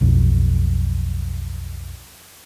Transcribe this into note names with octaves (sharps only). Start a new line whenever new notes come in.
B1 F2